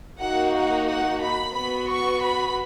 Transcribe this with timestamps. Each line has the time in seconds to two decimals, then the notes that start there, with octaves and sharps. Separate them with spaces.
0.20 A#3 D#4 F#4 F#5
0.53 F#5
0.87 F#5
1.21 B5
1.53 B3 F#4 B5
1.87 C#6
2.21 B5